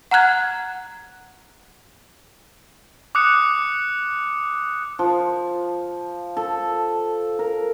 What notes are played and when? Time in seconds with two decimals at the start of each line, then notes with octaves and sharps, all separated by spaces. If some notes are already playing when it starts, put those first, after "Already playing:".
0.11 F#5 A#5 F6 F#6 G#6
3.15 D6 D#6 F#6 C#7
4.99 F3
6.37 A4
7.39 A#4